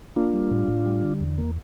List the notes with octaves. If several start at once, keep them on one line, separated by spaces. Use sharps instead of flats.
A#3 D4 F4
G3
A2
A2
G3
D3
E2
A#3